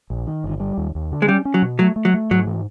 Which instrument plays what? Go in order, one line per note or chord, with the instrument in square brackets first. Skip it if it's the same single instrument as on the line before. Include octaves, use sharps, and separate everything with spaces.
[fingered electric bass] A#1
D#3
G1
G3
D#2
D#2
D3
[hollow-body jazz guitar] G#3
[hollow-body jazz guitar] G3 [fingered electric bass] C#4
[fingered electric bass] C#4
[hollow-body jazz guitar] F#3
[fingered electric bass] B2
[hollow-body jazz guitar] F#3 [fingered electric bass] A3
[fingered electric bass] A3
[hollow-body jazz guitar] F#3
[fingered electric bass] A3
[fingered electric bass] G#2 [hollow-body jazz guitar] F#3
[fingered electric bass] E3